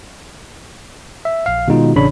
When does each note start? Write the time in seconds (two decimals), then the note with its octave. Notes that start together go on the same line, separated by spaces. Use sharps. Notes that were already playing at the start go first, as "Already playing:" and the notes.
1.25 E5
1.46 A#1 F5
1.68 B2 D#3 G#3 D#4 F4 F#4
1.95 A1 C#3 D4 C#5 B5